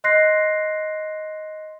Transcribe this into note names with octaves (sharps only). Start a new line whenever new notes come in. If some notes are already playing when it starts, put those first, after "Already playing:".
D#5 C6 F#6 A#6 C7